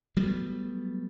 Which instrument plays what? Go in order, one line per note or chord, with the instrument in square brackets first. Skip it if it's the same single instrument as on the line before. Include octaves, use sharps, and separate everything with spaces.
[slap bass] F#3 G3 A3 B3